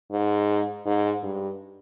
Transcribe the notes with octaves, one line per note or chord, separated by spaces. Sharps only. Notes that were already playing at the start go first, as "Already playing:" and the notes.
G#2
G#2
G2